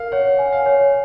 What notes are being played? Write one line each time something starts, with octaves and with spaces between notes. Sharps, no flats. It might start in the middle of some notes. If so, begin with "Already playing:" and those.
Already playing: A#4 F5
C#5 F#5
G#5
F#5
F5
C#5